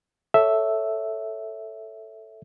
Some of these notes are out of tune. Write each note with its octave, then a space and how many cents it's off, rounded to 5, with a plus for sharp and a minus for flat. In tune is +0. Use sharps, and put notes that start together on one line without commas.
A4 +0 C#5 +15 E5 +0